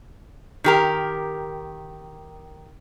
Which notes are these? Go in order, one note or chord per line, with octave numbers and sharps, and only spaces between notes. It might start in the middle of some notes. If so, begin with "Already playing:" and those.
D#3 G4 A#4